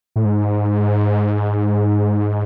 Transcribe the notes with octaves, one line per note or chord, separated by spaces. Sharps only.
A2
G#2